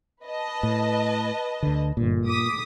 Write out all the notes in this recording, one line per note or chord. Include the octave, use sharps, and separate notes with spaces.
B4 D#5 A5
A2
D2 D3
G1 A#2
D6 D#6 B6